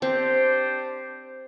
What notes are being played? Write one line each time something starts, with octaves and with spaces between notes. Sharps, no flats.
C4 D4 G4 C5